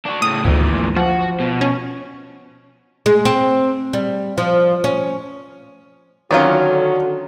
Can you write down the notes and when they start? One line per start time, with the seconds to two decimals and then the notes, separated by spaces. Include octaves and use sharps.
0.06 D4 F#4
0.22 A2 C#3 D#6
0.45 G#1 D2 A#2 E3
0.96 F3 F#4 F#5
1.40 B2
1.61 C#4
3.06 G#3
3.25 C4
3.93 G3
4.38 F3
4.84 C#4
6.31 D3 D#3 F#3 C#4 F4 F#4 C#5 D5